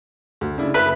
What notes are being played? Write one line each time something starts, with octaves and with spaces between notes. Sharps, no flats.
D2
C#3 D4 E4
F#1 B4 E5 B6